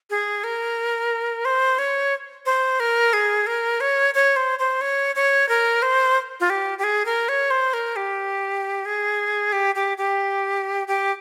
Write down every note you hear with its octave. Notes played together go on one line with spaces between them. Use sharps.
G#4
A#4
C5
C#5
C5
A#4
G#4
A#4
C#5
C#5
C5
C5
C#5
C#5
A#4
C5
F4
G4
G4
G#4
A#4
C#5
C5
A#4
G4
G#4
G4
G4
G4
G4